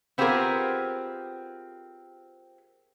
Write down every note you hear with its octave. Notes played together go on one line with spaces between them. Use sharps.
B3 C4 F4 G4 G#4 A#4